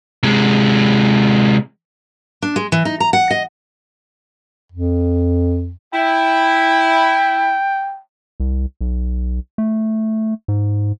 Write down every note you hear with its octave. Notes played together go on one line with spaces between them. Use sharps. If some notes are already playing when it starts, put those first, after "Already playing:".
C3 G#3
D4
G#3
E3
D#4
A#5
F#5
D#5
F2
E4 G5
C2
B1
A3
G#2